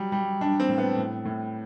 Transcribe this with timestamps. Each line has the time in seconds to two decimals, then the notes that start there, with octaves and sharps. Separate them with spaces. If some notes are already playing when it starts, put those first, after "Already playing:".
Already playing: F#3 G3
0.12 G3
0.41 G3 D4
0.60 C4
0.69 A2
0.78 B3
0.97 A2
1.25 A2